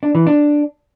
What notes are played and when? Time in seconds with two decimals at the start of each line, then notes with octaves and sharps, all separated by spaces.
0.03 D4
0.15 E3
0.27 D4